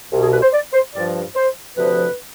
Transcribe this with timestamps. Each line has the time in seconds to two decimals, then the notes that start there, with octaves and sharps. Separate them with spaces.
0.11 C2 B2
0.22 G#4
0.33 B4
0.42 C5
0.53 D5
0.73 C5
0.94 G2 F3 D5
1.35 C5
1.76 D2 C3 F3 B4